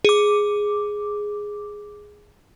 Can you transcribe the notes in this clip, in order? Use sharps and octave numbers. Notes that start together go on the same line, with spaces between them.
G#4 D6